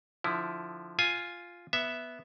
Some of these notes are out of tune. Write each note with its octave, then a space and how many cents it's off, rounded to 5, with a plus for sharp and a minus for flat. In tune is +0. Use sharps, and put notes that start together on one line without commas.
D3 +0 F3 +0 E4 +0
F4 +0 G#5 +0
B3 -5 E5 +0